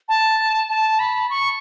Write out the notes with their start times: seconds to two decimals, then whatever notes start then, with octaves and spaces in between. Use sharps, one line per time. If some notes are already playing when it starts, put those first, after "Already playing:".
0.09 A5
0.69 A5
0.99 B5
1.30 C#6